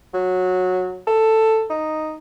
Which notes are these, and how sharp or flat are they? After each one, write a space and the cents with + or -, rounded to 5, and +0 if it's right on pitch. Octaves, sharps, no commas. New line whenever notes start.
F#3 -15
A4 +10
D#4 +0